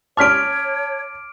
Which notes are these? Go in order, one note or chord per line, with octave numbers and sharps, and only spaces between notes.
C#4 C#5 A5 C6 D6 F6 B6 D7